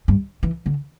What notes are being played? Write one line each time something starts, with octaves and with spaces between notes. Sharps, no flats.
G2
E3
D3